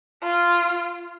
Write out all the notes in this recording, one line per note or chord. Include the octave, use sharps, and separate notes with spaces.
F4